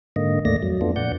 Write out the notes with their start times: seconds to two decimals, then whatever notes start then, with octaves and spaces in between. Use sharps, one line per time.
0.16 G#2 D3 A#3 D#5
0.45 D#2 A2 A3 A#3 D5 A#6
0.63 F2 F#3
0.81 A3 B3 D4 F4
0.96 F2 A#2 D5 F#5 G6